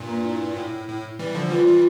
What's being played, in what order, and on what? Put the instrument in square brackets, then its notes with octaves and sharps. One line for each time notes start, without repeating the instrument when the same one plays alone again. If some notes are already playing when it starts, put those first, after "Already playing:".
Already playing: [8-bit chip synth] G2 A#2
[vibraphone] A#3
E4
[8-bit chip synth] A2
A2
E3 G3
D3 F3
[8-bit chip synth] E3 G3 [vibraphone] F4
[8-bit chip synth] E3 G3